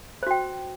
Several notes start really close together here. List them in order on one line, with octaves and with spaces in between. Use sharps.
C5 F#4 G5